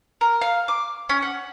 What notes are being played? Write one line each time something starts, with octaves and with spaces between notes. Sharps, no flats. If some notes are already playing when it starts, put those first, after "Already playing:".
A#4
F5
D6
C#4
F#5